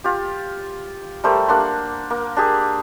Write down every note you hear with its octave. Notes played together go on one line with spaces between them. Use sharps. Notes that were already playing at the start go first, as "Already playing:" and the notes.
F4 G4
G3 A3 A#4 C5
A#3 D4 F#5 C6
A#3
D4 G4 G#4